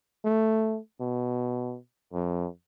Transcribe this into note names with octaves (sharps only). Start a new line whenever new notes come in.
A3
B2
F2